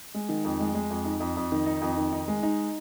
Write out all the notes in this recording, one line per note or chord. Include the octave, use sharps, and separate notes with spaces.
G#3
D#3
F2
G#3
G#3
F2
D#4
F2
F2
D#3
D#4
F2
D#3
D#4
G#3
D#4